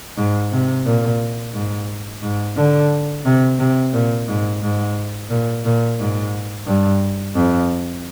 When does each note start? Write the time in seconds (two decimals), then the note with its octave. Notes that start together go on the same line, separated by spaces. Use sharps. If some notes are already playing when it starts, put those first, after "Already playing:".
0.17 G#2
0.52 C3
0.86 A#2
1.54 G#2
2.22 G#2
2.56 D3
3.25 C3
3.59 C3
3.93 A#2
4.28 G#2
4.62 G#2
5.30 A#2
5.65 A#2
5.99 G#2
6.66 G2
7.35 F2